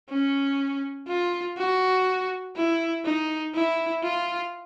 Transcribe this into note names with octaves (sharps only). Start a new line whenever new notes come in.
C#4
F4
F#4
E4
D#4
E4
F4